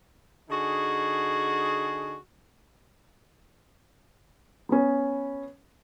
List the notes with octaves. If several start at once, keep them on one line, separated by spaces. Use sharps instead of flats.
D3 D#4 F#4 G#4
B3 C#4